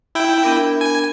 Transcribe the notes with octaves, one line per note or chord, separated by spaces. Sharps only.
E4 G5
B3 D4 A#4
G#5